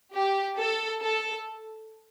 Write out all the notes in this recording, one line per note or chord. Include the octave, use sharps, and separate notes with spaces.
G4
A4
A4